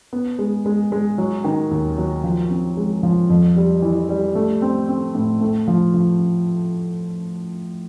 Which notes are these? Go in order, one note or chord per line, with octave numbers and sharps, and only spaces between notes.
B3
G#3
G#3
G#3
F#3
D#3
D#2
F#3
F3
C4
G#3
F3
F2
G3
E3
G3
A3
C4
C4
A2
A3
F3
F3